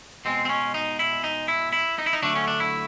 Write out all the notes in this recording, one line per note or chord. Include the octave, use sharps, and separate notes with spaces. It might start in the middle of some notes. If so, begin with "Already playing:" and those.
B2 G#3 C4
C4
C#4
D#4
E4
D#4
E4
E4
D#4
E4
D#4
D3 F#3 A3 D4
C#4
D4
E4